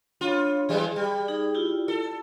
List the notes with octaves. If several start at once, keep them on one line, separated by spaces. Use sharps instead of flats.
D4 F4 C#5 B5
E3 G3 G#3 G#4
G3
D#4 G#4
E4 F4 G4
A4